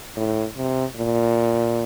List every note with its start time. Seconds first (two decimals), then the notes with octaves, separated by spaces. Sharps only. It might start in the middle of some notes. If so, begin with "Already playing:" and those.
0.16 A2
0.56 C3
0.97 A#2